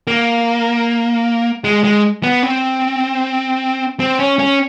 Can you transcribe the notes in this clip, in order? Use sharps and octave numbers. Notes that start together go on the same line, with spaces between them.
A#3
G#3
G#3
B3
C4
C4
C#4
C#4